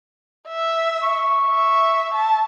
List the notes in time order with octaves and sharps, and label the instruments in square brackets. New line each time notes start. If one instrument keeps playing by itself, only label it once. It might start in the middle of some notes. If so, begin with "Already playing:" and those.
[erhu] E5
[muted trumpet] C#6
[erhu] E5
A5